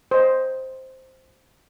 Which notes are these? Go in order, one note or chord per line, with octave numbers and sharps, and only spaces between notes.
C5 D#5